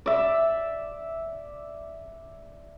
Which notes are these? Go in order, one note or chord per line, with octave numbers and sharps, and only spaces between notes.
D5 E5